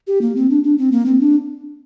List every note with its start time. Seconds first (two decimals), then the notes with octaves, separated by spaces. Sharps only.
0.07 G4
0.21 A#3
0.36 C4
0.50 D4
0.64 D4
0.78 C4
0.92 A#3
1.06 C4
1.20 D4